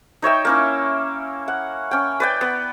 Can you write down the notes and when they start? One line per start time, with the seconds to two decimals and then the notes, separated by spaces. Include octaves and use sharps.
0.22 D#4 C#5 E5 G5
0.45 A#3 C#4 E4
1.48 F#5
1.91 C#4 G5
2.20 B4 D5 G5
2.41 B3